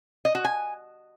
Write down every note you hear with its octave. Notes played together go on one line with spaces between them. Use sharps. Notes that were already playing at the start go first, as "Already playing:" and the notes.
D#5
F#4
G#5